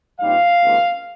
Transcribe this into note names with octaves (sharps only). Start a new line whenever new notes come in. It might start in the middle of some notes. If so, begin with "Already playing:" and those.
A#1 A#2 G3 C4 D#4 F5
C#2 C3 D#3 A#3